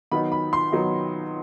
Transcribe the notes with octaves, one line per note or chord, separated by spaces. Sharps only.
D#3 F#3 B3 D#4 B5
B5
C6
D#3 F#3 B3 D#4